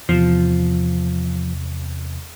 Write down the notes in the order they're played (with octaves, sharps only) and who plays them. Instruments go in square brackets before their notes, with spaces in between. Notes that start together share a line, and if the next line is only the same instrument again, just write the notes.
[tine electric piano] E2 C3 [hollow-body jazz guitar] F3